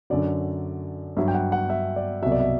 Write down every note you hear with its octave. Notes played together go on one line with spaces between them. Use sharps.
F#2 D3 F#3 D5
G2 F#3 E5
G5
F#5
F#5
E5
D5
C2 B2 F#3 E5
D5
E5